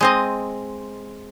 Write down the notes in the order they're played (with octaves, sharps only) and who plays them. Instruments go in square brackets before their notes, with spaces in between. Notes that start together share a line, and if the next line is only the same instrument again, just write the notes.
[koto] G#3 C4 D#5